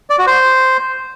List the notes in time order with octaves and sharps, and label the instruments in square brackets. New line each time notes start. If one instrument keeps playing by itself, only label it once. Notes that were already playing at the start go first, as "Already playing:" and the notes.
[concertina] D5
F#4
C5